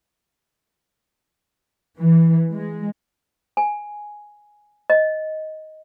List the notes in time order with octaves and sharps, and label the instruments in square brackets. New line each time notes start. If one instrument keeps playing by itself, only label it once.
[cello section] E3
G#3
[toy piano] G#5
D#5